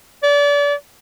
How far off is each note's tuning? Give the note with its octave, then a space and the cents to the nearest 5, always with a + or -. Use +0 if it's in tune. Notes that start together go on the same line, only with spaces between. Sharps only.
D5 -35